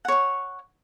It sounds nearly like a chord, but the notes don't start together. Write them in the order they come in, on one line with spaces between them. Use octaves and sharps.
F#5 C#5 C#6